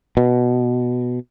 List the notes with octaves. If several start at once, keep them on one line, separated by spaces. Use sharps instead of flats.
B2